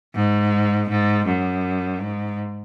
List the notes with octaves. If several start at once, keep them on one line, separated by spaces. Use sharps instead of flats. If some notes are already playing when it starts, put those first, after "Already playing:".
G#2
G#2
F#2
G#2